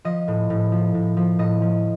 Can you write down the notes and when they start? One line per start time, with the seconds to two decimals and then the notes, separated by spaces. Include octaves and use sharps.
0.05 F3 D#5
0.28 A2
0.50 A2
0.72 F3
0.94 A2
1.17 F3
1.39 A2 D#5
1.62 F3